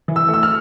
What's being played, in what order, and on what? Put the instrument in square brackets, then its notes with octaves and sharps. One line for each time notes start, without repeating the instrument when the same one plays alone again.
[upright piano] E3
E6
A3
E6
F6